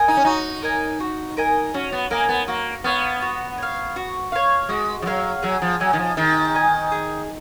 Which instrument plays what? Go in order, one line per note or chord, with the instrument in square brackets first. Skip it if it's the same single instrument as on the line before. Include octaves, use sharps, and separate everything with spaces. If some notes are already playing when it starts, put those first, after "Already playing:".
Already playing: [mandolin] A#4 D#5 G#5
[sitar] D#4
C#4
[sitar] D#4 [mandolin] F#4
[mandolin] A#4 D#5 G#5
F#4
A#4 D#5 G#5
[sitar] C#4 [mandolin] F#4
[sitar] B3
[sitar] A#3 [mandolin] A#4 D#5 G#5
[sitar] B3
[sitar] A#3 [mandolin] F#4
[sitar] B3 [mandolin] C#5 F5
[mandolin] F#4
C#5 F5
F#4
C#5 F5
[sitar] G#3 [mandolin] F#4
[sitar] F3
[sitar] F#3 [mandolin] C#5 F5
[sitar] F#3 [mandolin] G#4
[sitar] F3
[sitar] F#3 [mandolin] D#5 G#5
[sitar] D#3
F3
[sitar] D#3 [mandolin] G#4
[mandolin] D#5 G#5
G#4